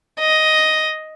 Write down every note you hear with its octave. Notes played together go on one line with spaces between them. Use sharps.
D#5